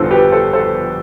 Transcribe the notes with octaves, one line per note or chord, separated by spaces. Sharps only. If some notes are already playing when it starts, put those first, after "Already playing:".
Already playing: G1 F2 D3 F3 A4 C5
G4 B4
A4 C5
A4 C5